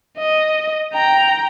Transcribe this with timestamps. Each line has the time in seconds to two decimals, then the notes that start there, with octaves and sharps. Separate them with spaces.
0.18 D#5
0.94 G5 A#5